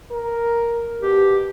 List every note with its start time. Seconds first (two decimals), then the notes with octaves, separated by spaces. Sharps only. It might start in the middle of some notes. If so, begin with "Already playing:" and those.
0.11 A#4
1.01 B2 G4